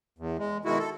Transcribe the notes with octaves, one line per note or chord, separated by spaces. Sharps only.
E2
G#3
B2 D#3 G#3 E4 F#4
A4